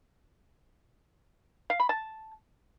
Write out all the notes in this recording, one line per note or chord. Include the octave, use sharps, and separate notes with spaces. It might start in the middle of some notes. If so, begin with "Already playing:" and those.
F5
B5
A5